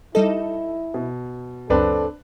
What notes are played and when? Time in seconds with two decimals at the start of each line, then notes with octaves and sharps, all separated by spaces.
0.15 G3 D#4 E4 A4 D#5
0.94 B2
1.70 C#2 F#2 C4 D4 A4 B4